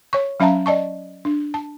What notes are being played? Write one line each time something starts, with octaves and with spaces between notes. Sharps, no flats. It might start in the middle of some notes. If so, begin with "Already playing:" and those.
C#5 C#6
F#3 C#4 E5 F5 A5 A#5
D5 D#5 A5 C#6
D4
A5